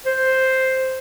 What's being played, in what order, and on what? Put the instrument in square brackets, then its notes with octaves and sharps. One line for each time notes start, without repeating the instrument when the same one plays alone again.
[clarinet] C5